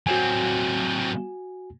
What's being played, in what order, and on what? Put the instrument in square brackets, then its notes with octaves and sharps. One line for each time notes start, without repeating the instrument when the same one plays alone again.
[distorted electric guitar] F#3 C4 [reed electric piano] F#4 G#5